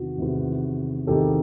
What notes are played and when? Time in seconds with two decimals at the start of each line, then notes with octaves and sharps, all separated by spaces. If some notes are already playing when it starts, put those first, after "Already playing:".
Already playing: E2 C3 D#3 F#4
0.18 E2 C3 D#3
1.07 E2 C3 D#3 G4 A4